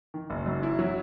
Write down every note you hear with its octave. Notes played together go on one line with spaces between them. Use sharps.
D#3
F#1
F#2
E4
F#3